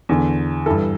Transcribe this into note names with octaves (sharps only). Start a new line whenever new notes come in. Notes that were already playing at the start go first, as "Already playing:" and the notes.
E2 D3
G2 E3 A4